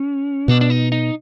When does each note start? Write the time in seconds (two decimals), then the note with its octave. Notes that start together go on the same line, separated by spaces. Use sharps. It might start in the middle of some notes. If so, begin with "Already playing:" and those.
Already playing: C#4
0.48 B2 D4
0.61 D4
0.70 D#4
0.92 D#4